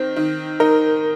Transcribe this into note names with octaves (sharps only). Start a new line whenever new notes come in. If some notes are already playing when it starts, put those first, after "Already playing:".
Already playing: D#3 C4
D#3
D#4 A#4